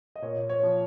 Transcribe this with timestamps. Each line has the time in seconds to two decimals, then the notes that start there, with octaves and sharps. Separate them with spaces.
0.16 D#5
0.22 A#2 C#5
0.49 C#5
0.63 F3